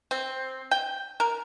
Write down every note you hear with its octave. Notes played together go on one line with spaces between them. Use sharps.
C4
G5
A#4